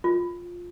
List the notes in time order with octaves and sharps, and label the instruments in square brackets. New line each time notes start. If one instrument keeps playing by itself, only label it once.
[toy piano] F4